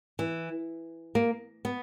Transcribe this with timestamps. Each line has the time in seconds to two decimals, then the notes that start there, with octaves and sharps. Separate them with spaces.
0.19 E3
1.15 A#3
1.65 B3